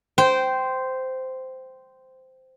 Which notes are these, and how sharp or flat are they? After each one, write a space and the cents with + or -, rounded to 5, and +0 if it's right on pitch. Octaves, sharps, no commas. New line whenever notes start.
C5 -10 G5 -15